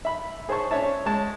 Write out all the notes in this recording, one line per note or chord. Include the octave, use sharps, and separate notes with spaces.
E5 B5
G#4 C5 C#5 A5 C#6
C#4 D4 C#5 E5 A5
G#3 C#5 A5